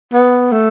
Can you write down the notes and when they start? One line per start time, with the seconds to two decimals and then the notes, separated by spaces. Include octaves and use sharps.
0.13 B3
0.52 A3